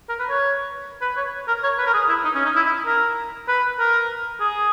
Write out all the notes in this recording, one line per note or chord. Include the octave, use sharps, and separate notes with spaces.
A#4
B4
C#5
B4
C#5
A#4
C#5
B4
A#4
G#4
E4
D#4
C#4
D#4
E4
E4
A#4
B4
A#4
G#4